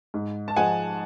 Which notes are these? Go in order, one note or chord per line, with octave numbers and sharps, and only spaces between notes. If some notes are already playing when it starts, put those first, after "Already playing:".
G#2
A5
F3 G#3 F#5 G#5